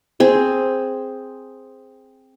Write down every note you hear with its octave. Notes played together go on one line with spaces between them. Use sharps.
C4 G#4